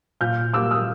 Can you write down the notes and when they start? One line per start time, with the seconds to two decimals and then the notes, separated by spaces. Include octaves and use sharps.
0.21 A#2 F6 G6
0.53 G3 A#3 D6 E6
0.71 D#6 F6